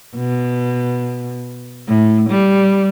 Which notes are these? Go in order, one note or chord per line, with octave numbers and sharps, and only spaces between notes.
B2
A2
G3